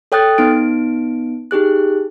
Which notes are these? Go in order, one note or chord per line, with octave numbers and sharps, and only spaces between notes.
A4 C#5 G5 D#6 F#6 A6
B3 D#4 D7
D#4 G4 G#4 F#6